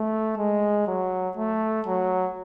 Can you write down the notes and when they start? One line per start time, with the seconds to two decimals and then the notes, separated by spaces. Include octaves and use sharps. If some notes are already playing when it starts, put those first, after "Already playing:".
Already playing: A3
0.38 G#3
0.87 F#3
1.37 A3
1.87 F#3